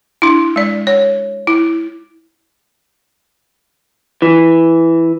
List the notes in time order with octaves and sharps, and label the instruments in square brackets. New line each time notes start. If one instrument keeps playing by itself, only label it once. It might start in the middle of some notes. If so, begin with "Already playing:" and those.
[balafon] D4 E4
G#3 D5
C#5
E4
[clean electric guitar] E3